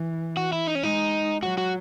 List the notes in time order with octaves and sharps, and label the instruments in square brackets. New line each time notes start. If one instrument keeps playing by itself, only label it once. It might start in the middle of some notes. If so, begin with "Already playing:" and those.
Already playing: [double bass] E3
[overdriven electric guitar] F#4
E4
D#4
C#4
[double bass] G#3 [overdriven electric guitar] D#4
[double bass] F#3 [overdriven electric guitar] F#4
[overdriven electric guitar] F#4